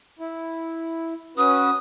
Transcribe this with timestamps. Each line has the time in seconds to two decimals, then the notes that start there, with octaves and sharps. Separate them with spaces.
0.19 E4
1.37 C#4 F#4 B4 D#6